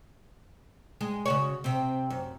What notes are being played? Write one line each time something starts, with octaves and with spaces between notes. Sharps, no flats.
G#3
C#3 F#4 C#5
C3 C4
F#2